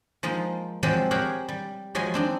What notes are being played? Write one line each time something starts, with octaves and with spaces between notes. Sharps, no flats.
F3 G#3 A#3 D#4
F3 F#3 G#3 C4 C5 D5
G4 G#4 A#4 C5 C#5 F#5
G3
F3 F#3 G#3 D#5 G#5
C4 D4 D#4